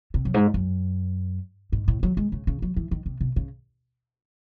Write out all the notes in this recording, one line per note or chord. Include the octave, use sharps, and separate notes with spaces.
C3
F#2
G#2
F#2
G#2
A2
F#3
G#3
C#3
C#3
F#3
E3
D#3
C3
C3
C#3